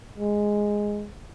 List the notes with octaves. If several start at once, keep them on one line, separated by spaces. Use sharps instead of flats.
G#3